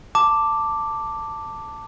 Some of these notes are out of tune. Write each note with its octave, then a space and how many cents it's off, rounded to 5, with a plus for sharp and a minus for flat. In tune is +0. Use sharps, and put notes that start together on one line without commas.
A5 +15 D6 +0